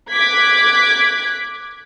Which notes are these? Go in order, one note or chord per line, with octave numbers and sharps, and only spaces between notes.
D6 F#6 G#6 B6